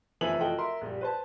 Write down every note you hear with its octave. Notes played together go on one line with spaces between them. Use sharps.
F1 E3 F3 E4 G#5 F#7
F4 F#4 A4 D#5 G5
A#4 E5 C6
A#1 G3
B4 C5 A5